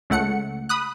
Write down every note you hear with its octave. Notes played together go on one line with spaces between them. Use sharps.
C#2 A3 F#5 C#7
B5 D#6 F#6